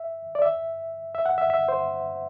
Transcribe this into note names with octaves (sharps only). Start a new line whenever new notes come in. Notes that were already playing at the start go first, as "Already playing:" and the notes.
Already playing: E5
D5
E5
E5
F#5
E5
E5
C5